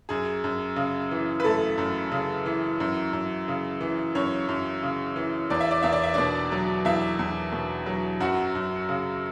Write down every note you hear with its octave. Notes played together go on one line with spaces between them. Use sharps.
F#2 G#4
F#2
C#3
E3
B4
F#2 A3 A4
F#2
C#3
E3
F#2
F#2
C#3
E3
F#2 C#4 C#5
F#2
C#3
E3
E2 D5
E5
D5
E2 E5
D5
E5
B2 D4 D5
F#3
E2 E4 E5
E2
B2
F#3
F#2 F#4 F#5
F#2
C#3